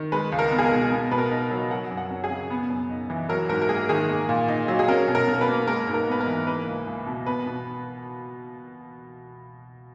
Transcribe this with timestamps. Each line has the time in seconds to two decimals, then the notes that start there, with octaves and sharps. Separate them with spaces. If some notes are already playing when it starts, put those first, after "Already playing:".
Already playing: D#3
0.12 G#3 B4
0.32 C#2
0.39 A#4
0.51 B3
0.59 G#4
0.65 A#4
0.72 B2
0.91 B3
1.11 B2 B4
1.18 A#4
1.31 D#4
1.51 F#3
1.71 F#3 F#5
1.91 F#2
1.97 F#5
2.10 C#4
2.24 G#4
2.30 C#3
2.50 B3
2.70 F#2
2.90 D#4
3.10 E3
3.29 F#3 A#4
3.49 G#2 A#4
3.62 A#4
3.69 A#3 G#4
3.89 D#3 G#4
4.09 A#3
4.29 A#2
4.48 D#4
4.68 F#3
4.79 G#4
4.88 C#4 A#4
5.08 B2
5.15 A#4
5.28 B2
5.33 A#4
5.41 B4
5.48 A#3
5.67 G#3 A#4
5.87 G#2
5.94 A#4
6.07 B3 B4
6.20 A#4
6.27 E3
6.47 A#3 B4
6.67 C#2
6.87 C#2
7.07 B2
7.26 B3 B4
7.46 B2